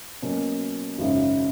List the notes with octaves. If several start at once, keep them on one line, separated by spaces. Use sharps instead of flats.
B2 F#3 A#3 C#4
G#1 F#2 C#3